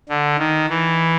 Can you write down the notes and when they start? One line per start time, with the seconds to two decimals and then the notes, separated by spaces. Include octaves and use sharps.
0.09 D3
0.39 D#3
0.70 E3